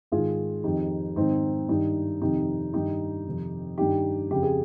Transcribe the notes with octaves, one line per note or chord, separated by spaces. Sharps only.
G#2 D#3 F4 G#4
F2 D#3 D#4 G4
G#2 D#3 C4 D#4
G2 D#3 D#4 G4
F2 C3 D#3 D#4 G4
G2 D#3 D#4 G4
F2 C3 D#3
G2 D#3 D#4 G4
F2 C#3 G4
G#4